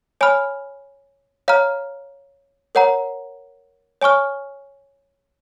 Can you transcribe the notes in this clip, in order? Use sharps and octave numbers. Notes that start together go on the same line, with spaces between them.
C#5 G#5 B5 F6
C#5 F5 A#5 F6
A#4 C#5 F#5 A#5
C#5 G#5 C#6 F6